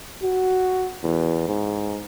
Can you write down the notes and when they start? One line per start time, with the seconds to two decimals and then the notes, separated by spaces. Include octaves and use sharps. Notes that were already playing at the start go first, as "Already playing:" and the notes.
0.23 F#4
1.03 E2
1.48 G#2